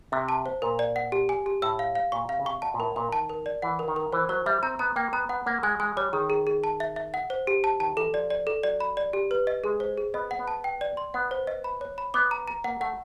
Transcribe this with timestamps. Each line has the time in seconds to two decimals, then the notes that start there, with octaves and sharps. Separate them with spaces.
0.12 C3 E5
0.29 A5
0.46 C5
0.62 A#2 A#4
0.79 D5
0.96 F#5
1.12 G4
1.29 G#5
1.46 G4
1.62 A2 E6
1.79 F5
1.95 F5
2.12 A#2 C#6
2.29 C3 F5
2.40 C#3
2.46 C3 C#6
2.62 B2 A5
2.74 A#2
2.79 A2 A#4
2.96 A#2 A#4
3.12 D#3 A5
3.29 A#4
3.46 D5
3.62 E3 F#5
3.79 A#4
3.88 D#3
3.96 A#4
4.12 E3 C5
4.29 F#3 C5
4.46 G3 E5
4.63 C4 A#5
4.79 B3 A#5
4.96 A#3 G5
5.13 B3 A#5
5.29 B3 F#5
5.46 A#3 F#5
5.63 G#3 G#5
5.80 G#3 G#5
5.97 G3 C#5
6.13 D#3 G#4
6.30 G#4
6.47 G#4
6.64 A5
6.80 E5
6.96 E5
7.14 F#5
7.30 C5
7.47 G4
7.64 A5
7.80 D#3 A5
7.97 E3 A4
8.14 F3 D5
8.30 D5
8.47 A4
8.63 F#3 D5
8.80 B5
8.97 D5
9.13 G4
9.31 B4
9.47 D#5
9.64 G#3 G#4
9.80 C5
9.98 G#4
10.14 B3 D#5
10.31 F#5
10.39 B3
10.48 A5
10.64 G5
10.81 D5
10.97 C6
11.14 B3 F#5
11.31 C5
11.47 D#5
11.64 B5
11.81 C#5
11.98 B5
12.14 B3 D6
12.31 A#5
12.48 A#5
12.64 A#3 F#5
12.81 A3 F#5